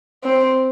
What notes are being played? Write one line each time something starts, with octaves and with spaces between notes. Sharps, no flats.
C4